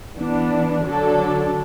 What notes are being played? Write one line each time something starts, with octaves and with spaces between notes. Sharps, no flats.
E3 B3 D4
D3 F#3 D4 A4